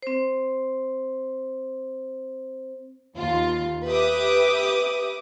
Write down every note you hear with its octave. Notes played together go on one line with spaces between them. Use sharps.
C4 C5
D#2 F4
G4 B4 E5 D6 D#6